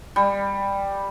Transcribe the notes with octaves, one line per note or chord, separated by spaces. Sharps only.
G3